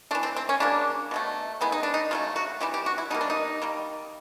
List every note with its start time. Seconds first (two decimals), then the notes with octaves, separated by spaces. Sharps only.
0.11 A3 D4
0.15 E3
0.23 C4
0.36 C4
0.49 C#4
0.60 C#3 F#3 A#3 D4
1.11 B2 F#3 A3
1.61 D#3 G#3 B3 E4
1.72 D#4
1.83 D4
1.94 D#4
2.11 C#3 F#3 A3 F4
2.36 F#4
2.61 C3 E3 G3 G4
2.74 G4
2.86 F#4
2.98 E4
3.11 B2 G3 A#3 D#4
3.21 D4
3.30 D#4
3.62 D#3 G3 A#3